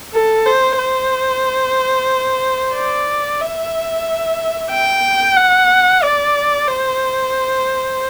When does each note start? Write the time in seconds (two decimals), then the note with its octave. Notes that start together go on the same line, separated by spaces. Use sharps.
0.13 A4
0.46 C5
0.78 C5
2.75 D5
3.41 E5
4.71 G5
5.36 F#5
6.03 D5
6.67 C5